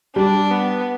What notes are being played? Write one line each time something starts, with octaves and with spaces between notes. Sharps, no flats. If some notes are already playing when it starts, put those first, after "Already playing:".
G3 D4
B3